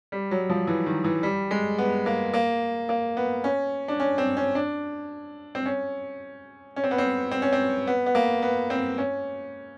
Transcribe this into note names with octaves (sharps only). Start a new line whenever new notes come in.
G3
F#3
F3
E3
D#3
E3
G3
G#3
B3
A#3
A#3
A#3
B3
C#4
D4
C#4
C4
C#4
D4
C4
C#4
C#4
C4
B3
C4
C4
C#4
C4
B3
B3
A#3
B3
C4
C#4